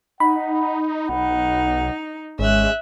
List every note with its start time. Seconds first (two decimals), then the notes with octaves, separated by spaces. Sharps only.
0.20 D#4 F#5 B5
1.09 B1 D#4 F#5
2.39 G#1 G#3 C#4 E5 F#6